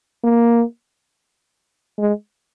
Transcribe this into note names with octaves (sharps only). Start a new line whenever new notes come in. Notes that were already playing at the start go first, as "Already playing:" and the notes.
A#3
G#3